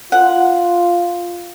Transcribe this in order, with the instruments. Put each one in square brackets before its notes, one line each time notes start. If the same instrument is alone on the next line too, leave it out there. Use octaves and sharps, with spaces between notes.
[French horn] F4 [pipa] F#5